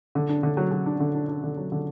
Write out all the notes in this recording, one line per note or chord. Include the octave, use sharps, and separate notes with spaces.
D3
D4
D3
F#3
F#3
D4
D3
D4
D4
D3
F#3
D3